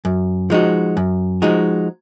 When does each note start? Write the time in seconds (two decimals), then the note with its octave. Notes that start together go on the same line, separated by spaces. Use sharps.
0.05 F#2
0.50 F3 G#3 D#4 F#4
0.97 F#2
1.42 F3 G#3 D#4 F#4